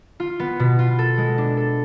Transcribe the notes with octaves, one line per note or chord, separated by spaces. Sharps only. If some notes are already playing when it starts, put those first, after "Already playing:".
F4
B3
B2
F4
A4
G#3
D4
A4